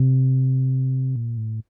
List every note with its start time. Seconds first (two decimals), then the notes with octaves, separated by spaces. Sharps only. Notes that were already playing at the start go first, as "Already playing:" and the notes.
Already playing: C3
1.16 A#2
1.37 A2